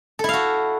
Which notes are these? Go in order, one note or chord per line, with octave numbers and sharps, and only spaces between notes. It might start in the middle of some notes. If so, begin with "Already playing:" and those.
E4 F#4 A4 F5